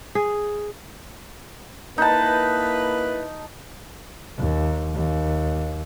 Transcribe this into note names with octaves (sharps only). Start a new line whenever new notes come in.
G#4
A#3 D#4 E4 B4 A5
D#2
D#2